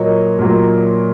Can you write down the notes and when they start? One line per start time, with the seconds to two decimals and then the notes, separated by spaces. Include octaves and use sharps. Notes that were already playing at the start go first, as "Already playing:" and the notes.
Already playing: A#2 F#3 A#3 C#5 D#5
0.39 A#2 F#3 A#3